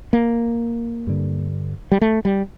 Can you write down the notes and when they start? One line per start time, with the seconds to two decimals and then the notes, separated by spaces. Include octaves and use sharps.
0.13 A#3
1.07 G2 D3
1.92 G3
2.01 A3
2.25 G3